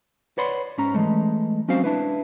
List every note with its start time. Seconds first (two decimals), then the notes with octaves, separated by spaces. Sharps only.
0.38 B4 C#5 D5 F#5 B5 C6
0.78 G#2 C#4 A#5
0.94 E3 G#3 A3
1.68 F#3 C4 C#4 F#4 C5 F5
1.84 D4 E4 B4